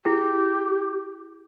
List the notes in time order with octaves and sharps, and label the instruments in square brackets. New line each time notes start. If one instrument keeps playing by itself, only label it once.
[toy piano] E4 G#4 G5 [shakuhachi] G4